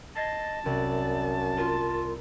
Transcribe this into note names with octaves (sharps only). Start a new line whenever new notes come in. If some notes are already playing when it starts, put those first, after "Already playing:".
D#5 A5 G#6 A6 C7
C2 F#2 D5
F4 A#4